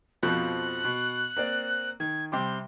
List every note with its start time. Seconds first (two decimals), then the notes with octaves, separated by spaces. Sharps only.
0.23 F2 B2 F3 F#6
0.85 B2
1.36 A#3 C4 D5
2.00 D#3 G#6
2.32 C3 G3 C6 D6